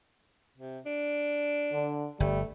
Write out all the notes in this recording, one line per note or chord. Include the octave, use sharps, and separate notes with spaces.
C3
D4
D3
G1 G3 A3